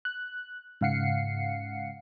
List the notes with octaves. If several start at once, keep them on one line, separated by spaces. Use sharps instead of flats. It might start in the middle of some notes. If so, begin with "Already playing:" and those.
F#6
G#2 C#3 F5 F#5 C7 C#7